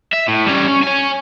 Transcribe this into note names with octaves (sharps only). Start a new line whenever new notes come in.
E5
A2
G3 C#4
C#4
C#5 G#5